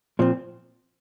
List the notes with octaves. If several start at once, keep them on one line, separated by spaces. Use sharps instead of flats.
A#2 F3 C4